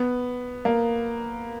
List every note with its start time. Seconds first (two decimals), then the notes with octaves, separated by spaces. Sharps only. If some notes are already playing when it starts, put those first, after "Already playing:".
Already playing: B3
0.65 A#3